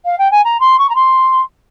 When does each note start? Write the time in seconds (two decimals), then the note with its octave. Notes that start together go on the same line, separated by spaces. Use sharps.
0.05 F5
0.18 G5
0.31 G#5
0.44 A#5
0.60 C6
0.78 C#6
0.89 A#5
0.95 C6